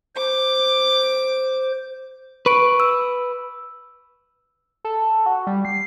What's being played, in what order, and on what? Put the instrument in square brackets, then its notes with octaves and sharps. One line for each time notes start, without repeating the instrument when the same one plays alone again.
[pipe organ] C5 [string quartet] D6
[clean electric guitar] B4 [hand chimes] C#6 D7
[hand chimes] E6
[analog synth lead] A4
F#4
G3
C7